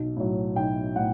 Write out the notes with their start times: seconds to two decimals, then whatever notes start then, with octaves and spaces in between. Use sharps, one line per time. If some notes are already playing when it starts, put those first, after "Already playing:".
Already playing: B1
0.17 A2 F#3
0.56 B1 G5
0.96 A2 F#5